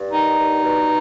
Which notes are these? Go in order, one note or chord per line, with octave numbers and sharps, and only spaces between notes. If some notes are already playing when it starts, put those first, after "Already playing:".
Already playing: G2
D#3 D#4
G2
B2